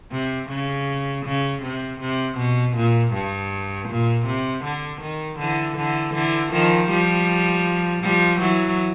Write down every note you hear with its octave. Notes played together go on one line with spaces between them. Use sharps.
C3
C#3
C#3
C3
C3
B2
A#2
G2
A#2
C3
D3
D#3
D3 E3
D3 E3
D3 E3
D#3 F3
F3 G3
F3 G3
E3 F#3